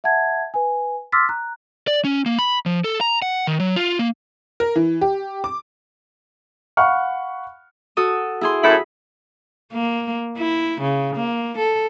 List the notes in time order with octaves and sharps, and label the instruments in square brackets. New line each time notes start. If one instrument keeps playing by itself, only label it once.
[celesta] E5 F#5 A5 G#6
B4 G#5
C6 D6 E6 F6 A6 B6
A#5 F#6
[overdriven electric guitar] D5
C#4
A#3
B5
F3
A4
A#5
F#5
D#3
F#3
F4
A#3
[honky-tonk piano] A#4
E3
G4
D6
[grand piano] F5 F#5 B5 C#6 F6
[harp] F#4 A4 D#6
E4 G#4 C6
[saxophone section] F#2 A2 E4 [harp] B5
[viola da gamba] A#3
E4
C#3
A#3
A4